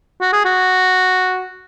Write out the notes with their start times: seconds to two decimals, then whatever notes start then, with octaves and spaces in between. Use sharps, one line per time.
0.21 F#4
0.33 G#4
0.45 F#4